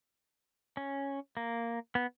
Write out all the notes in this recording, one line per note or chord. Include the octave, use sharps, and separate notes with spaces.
C#4
A#3
B3